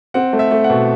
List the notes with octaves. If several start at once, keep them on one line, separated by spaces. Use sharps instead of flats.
C4 F#5
A3
E5
A3
F#5
B2